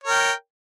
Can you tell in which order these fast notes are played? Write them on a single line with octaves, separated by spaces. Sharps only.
C#5 A#4 G5